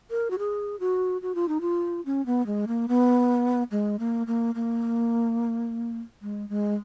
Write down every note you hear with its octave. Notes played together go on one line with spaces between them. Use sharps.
A#4
F#4
G#4
F#4
F#4
F4
D#4
F4
C#4
B3
G#3
A#3
B3
G#3
A#3
A#3
A#3
G#3
G#3